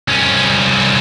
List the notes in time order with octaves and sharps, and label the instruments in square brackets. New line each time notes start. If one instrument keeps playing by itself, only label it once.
[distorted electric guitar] C2 C#4